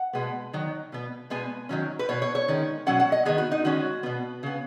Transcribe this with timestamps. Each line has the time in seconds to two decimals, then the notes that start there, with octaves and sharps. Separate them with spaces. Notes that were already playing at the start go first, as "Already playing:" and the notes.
Already playing: F#5
0.13 B2 G#3 B3
0.53 D#3 F#3
0.92 B2 B3
1.30 B2 G#3 B3 G#5
1.69 D#3 F#3 C#4
1.99 B4
2.09 B2 B3 C#5
2.22 C#5
2.35 C#5
2.48 D#3 G#3 C#4
2.86 B2 F#3 C#4 F#5
3.00 F#5
3.12 D#5
3.25 D#3 F#3 B3 G#4
3.38 F#4
3.52 D#4
3.64 D#3 G#3 C#4 F#4
4.03 B2 B3
4.43 C#3 B3